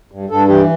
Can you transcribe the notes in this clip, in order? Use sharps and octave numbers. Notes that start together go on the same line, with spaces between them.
G2
G2 A4
E3 G4